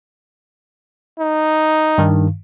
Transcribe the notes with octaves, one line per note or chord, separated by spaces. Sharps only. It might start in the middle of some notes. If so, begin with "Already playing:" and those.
D#4
G2 D#3